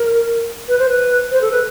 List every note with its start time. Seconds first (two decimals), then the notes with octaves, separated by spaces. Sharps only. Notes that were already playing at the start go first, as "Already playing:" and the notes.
Already playing: A#4
0.68 B4
0.79 C5
0.89 B4
1.31 C5
1.42 A4
1.52 B4